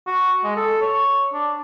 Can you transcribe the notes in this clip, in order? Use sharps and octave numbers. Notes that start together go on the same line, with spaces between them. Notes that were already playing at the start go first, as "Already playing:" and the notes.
F#4
G#3
A4
C#5
D4